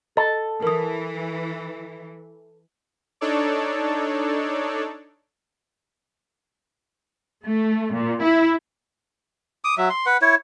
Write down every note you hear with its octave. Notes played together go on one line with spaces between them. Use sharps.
A4 D#5
E3 A#4 D#6
D4 D#4 A4 C#5 D5
A3
A#2
E4
D6 D#6
F#3 E5
C6
B4 F#5
E4 C#5